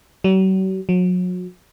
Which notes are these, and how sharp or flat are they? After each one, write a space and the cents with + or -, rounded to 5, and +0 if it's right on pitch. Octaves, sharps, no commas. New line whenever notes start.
F#3 +45
F#3 -35